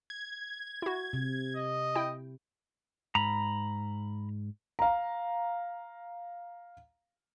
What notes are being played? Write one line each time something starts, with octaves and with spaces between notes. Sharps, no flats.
G#6
E4 F#4
C3
D#5
E4 G5
G#2 A#5 B5
F5 A#5